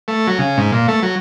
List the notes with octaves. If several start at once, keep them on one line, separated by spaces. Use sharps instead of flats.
A3
F#3
C#3
G#2
A#2
A3
F#3